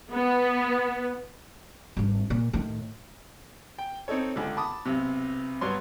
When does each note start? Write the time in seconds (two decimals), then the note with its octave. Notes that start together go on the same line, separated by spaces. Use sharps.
0.12 B3
1.97 G#1 G2
2.30 A#2
2.53 A2 D#3
3.79 G5
4.08 C4 D#4 A4 C#5
4.36 C#2 D3
4.57 A5 B5 D6 D#6
4.86 B1 C3
5.61 G2 F#3 B3 C#5 C6